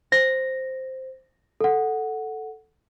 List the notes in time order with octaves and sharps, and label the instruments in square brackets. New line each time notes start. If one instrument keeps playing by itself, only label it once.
[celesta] C5 [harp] A#6
[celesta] A4 F#5